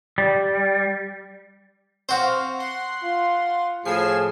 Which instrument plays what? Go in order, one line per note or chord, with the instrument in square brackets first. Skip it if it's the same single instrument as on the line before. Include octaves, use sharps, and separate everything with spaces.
[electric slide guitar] G3
[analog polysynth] C4 F5 [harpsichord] F#4 C5
[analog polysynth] F#5 C6
[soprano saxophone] F4
[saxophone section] A2 F3 [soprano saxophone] G#4 [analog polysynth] G#5 E6 C7